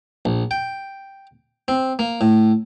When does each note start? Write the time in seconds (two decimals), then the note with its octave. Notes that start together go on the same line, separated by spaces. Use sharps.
0.25 A#1
0.51 G5
1.68 C4
1.99 A#3
2.21 A2